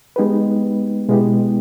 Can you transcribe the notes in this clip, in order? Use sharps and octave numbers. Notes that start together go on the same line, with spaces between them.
G#3 B3 D#4 G4 B4
B2 G#3 B3 E4 G4